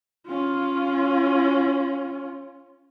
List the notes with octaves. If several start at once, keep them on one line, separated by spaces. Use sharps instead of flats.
C#4 F4